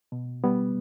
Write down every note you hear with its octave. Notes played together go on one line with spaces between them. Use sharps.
B2
G3 B3